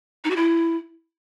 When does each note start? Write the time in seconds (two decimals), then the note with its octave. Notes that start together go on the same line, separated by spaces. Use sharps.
0.24 D#4
0.30 F#4
0.36 E4